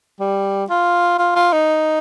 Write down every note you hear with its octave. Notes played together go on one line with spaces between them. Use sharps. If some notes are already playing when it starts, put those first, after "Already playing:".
G3
F4
F4
F4
D#4